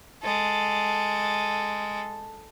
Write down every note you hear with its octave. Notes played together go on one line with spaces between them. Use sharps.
G#3 A4